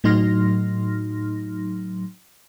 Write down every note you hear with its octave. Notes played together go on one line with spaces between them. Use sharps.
A2 F#3 D#4 C6 F6 A#6